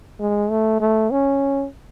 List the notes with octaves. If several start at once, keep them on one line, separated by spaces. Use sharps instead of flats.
G#3
A3
A3
C#4